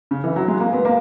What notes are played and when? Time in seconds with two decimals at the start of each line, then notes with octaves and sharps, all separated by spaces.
0.11 C#3
0.24 E3
0.36 F#3
0.48 G#3
0.60 A#3
0.73 B3
0.85 A#3